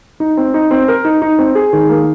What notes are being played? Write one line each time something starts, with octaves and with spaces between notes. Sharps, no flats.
D#4
C4
D#4
C4
A#4
D#4
D#4
C4
G#4
D#3
A#3